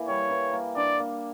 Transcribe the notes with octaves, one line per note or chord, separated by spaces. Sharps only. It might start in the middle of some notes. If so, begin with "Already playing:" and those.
Already playing: E3 A#3
G3 C#5
E3
A#3
D4 D5
A#3